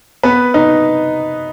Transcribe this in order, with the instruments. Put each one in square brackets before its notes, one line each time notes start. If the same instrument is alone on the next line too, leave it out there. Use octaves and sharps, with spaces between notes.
[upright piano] B3 B4
D#4